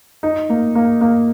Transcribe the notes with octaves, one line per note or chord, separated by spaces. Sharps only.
D#4
A#3
A#3
A#3